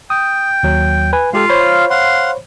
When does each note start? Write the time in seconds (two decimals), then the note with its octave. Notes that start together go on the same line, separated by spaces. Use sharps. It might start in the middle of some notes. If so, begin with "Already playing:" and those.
0.10 G5 D#6
0.63 D#2 F#3
1.13 B4 G#5
1.33 G#3 F4 G4 A4 F5
1.49 C5 C#5 B5
1.90 F5 F#5 C6